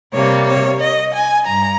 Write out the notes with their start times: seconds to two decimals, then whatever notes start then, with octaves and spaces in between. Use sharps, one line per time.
0.14 C3 G3 A#3 C#5
0.47 C#5
0.80 D#5
1.14 G#5
1.47 G2 A#5